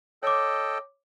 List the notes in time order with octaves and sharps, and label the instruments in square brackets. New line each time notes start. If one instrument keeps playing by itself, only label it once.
[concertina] A4 D#5 G5 [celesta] C#5 D6